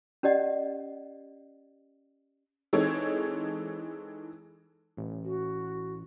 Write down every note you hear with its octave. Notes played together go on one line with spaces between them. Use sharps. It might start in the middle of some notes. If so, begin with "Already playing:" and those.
C#4 G4 D5 D#5 F#5
E3 G#3 C4 D#4 A4 C#5
A1
F#4